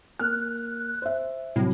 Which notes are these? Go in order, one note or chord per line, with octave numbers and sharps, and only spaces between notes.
A#3 F6 F#6
C5 E5
C2 A2 F#3